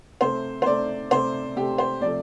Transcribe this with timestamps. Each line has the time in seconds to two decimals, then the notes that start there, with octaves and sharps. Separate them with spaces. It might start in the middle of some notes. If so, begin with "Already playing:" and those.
0.21 C3 A3 C5
0.62 C5
0.66 C3 A3 D5
1.11 C3 A3 C5
1.56 C3 A3 G4
1.78 C5
2.01 C3 F3 A3 D5